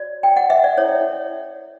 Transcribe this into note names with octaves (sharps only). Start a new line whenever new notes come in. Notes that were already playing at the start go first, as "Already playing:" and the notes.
Already playing: F#4 C#5 D5
G5
F#5
E5
D5
C#4 E4 A4 C#5